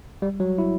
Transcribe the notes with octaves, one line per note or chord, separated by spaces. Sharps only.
G3
F#3
E4